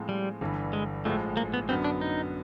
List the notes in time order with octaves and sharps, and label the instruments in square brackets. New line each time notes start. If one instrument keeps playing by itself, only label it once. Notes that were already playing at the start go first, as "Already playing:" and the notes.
Already playing: [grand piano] A2 F3 G#3 C4 F4
[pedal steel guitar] G3
[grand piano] G1 G2 E3
[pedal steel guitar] G#3
[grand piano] A1 A2 F3 G#3 [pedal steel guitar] A3
[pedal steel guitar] A#3
B3
[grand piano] F#2 D3 F#3 B3 [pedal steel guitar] C4
[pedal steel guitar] D4
D#4